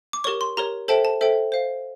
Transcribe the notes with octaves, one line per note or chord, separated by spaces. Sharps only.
D6
G4 A#4 C#5 C#6
C6
G4 A#4 C#5 A#5
A4 C5 E5 G5 A5
A5
A4 C5 E5 G5
C5 F5